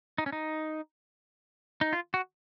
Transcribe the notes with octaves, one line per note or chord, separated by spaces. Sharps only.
D#4
C#4
D#4
D#4
F4
F#4